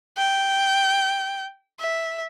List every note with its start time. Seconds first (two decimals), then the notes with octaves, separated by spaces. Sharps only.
0.18 G5
1.80 E5